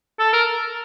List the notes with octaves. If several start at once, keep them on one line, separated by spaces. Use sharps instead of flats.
A4
A#4